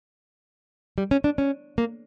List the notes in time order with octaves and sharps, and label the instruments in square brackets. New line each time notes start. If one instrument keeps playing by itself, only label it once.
[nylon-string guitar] G3
C#4
D4
C#4
A#3